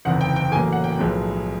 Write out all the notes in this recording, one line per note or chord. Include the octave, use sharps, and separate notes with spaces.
F#1 E2 C3 D#3 F#5
G5
G5
A1 A2 F#3 A#3 G#5
F#5
G5
B1 A2 F3 G#3 B3